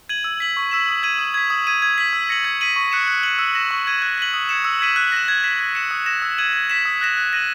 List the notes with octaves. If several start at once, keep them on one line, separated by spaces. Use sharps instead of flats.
G#6 D#7 F#7
E6
B6 F#7
C#6
E6 B6 E7
D#6
G#6 D#7 F#7
D#6
G#6 B6
D#6
G#6 D#7
G#6
B6 F#7
E6
A#6 C#7 F#7
G#6
B6 D#7 F#7
C#6
F#6 C#7 E7
F#6
C#7 F#7
E6
A#6 E7
C#6
G#6 D#7 F#7
F#6
B6 D#7 F#7
D#6
G#6 C#7 E7
E6
G#6 B6 D#7 F#7
F#6
A#6 E7
G#6
B6 E7
G#6
C#7 E7
D#6
A#6 E7
E6
G#6 D#7 F#7
G#6
B6 E7
D#6
F#6 A#6 E7
F#6
A#6 D#7 F#7